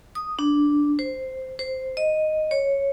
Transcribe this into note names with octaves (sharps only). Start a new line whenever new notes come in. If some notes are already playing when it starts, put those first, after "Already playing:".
D#6
D4
C5
C5
D#5
C#5